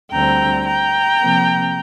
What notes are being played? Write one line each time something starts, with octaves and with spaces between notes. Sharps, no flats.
D2 D3 G3 C4 G5 A#5
G5 A#5
C3 F3 A#3